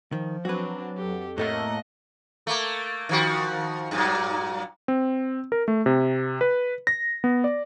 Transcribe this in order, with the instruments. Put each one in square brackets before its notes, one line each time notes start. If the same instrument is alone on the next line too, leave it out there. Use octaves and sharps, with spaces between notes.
[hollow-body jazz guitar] D#3 [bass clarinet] F3
[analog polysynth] F#3 [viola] C4 D4 [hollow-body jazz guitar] F#4 B4
[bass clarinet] F2 [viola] G4 A4
[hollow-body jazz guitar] A2 A4 C#5 [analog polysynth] A3 A#3 [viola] D#5 F#5
[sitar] A3 A#3
D#3 F3 F#4
G2 A#2 F#3
[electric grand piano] C4
A#4
A3
C3
B4
A#6
B3
D5